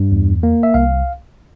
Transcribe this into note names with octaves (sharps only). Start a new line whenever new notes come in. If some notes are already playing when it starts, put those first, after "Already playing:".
Already playing: G2
E2
A#3
E5
C2 F5